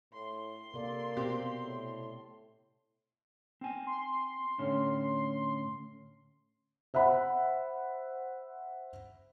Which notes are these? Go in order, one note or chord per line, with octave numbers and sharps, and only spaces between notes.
A2 C6
C3 A#3 A4 D5
B2 C4 G4
A2
C4 G#5
C6
A2 D3 C#4
C5 E5 F#5 B5